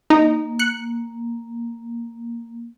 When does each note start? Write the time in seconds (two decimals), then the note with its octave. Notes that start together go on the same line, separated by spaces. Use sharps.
0.10 A#3 D#4
0.59 F#6 C#7